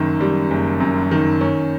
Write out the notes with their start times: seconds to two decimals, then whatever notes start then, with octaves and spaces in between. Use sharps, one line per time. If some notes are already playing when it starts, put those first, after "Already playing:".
Already playing: F#1 F#2 D#3
0.20 G3
0.51 F#1
0.80 F#2
1.11 D#3
1.41 C#4